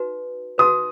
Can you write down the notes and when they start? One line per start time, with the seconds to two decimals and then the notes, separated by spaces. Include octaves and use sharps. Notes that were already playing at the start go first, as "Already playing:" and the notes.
Already playing: D#4 F#4 B4
0.58 D#4 F#4 B4 D#6